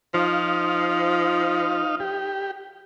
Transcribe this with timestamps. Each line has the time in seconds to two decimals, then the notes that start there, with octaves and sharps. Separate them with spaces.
0.14 F3 D#4 F5
2.00 G4